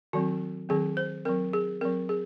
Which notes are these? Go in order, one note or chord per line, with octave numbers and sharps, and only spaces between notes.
D#3 F#3 C4 F#4
D#3 F#3 C4 G#4
C5
F#3 C4 A#4
G#4
F#3 C4 A#4
G#4